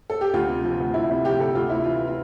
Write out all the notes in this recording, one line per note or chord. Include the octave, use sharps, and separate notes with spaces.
A4
G4
D2 F4
C3
F3
D2
D2 E4
C3 E4
F3 G4
D2 A4
D2 F4
C3 E4
E3 F4
F4